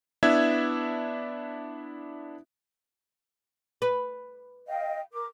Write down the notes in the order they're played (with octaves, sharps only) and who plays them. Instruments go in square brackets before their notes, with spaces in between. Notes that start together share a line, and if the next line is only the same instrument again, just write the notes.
[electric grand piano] B3 D4 E4 E5 E6 G#6
[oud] B4
[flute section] D#5 F5 G5
A#4 D6